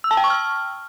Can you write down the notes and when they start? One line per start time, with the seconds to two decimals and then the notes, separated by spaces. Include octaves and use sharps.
0.04 E6
0.11 A5
0.17 G5
0.24 C#6
0.30 F6